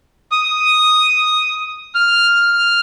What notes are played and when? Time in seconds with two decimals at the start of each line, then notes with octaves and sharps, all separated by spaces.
0.32 D#6
1.95 F6